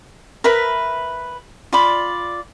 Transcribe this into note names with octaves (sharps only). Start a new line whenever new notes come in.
A#4 B4 E5 B5
F4 D5 B5